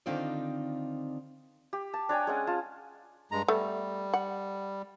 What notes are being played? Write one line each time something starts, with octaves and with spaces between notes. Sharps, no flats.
D3 D#3 C4 D#4 F4 D5
G4
A5
D4 C#5 G5 G#5
G#3 C#4 F#5
F4 A5
G2 G#3 A#5
G3 A3 B3
F#5